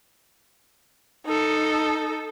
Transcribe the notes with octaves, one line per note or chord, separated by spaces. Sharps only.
D#4 A4